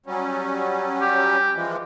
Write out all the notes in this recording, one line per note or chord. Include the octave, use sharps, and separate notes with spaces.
F#3 G3 C#4
G4
E3 F3 G#3